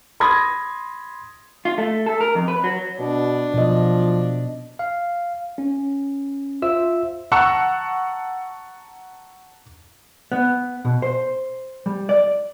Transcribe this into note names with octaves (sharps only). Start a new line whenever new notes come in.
B5 C6 D#6 G#6 A#6
F4
A3
A4
A#4
F2
B4
F#3
B2 D4
B2 F3 D#5
F5
C#4
F4 C5 E5 E6
F#5 A5 A#5 C#6 E6 F#6
B3
B2
C5
G3
D5